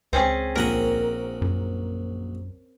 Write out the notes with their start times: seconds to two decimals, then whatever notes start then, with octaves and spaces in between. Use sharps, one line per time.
0.13 C#2 C4 C#4 G#4
0.56 A#1 A#4 F#5 D#6
1.42 F#2